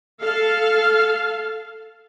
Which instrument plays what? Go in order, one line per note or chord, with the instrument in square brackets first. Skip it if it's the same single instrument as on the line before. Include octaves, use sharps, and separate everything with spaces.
[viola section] A4 F5